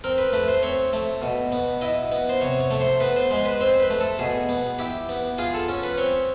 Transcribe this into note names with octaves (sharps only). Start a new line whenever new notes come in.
C4 A#4
B4
A3 B4
C5
C4 C#5
A3
B2
B3
E4 D#5
B3
C5
C3 C#5
C#5
A3
C5
B3 B4
C5
G#3 C5
B4
C4 C5
C5
B4
A3
A4
B2 G#4
B3
E4 G4
B3
F4 G#4
A4
C#4
B4
C4 C#5